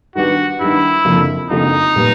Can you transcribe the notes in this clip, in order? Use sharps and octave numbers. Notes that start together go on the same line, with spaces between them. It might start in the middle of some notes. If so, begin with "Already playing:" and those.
D#3 G3 B3 D4 F#4 G4
D#3 G3 B3 D4 E4 G4
F#1 F2 D3 F3 A#3
F#1 F2 D3 F3 A#3 D#4
A#2 G3 B3